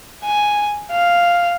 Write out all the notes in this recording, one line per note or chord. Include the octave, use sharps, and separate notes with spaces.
G#5
F5